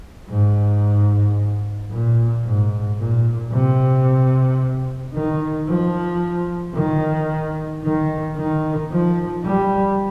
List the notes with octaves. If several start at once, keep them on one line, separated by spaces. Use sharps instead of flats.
G#2
A#2
G#2
A#2
C3
D#3
F3
D#3
D#3
D#3
F3
G3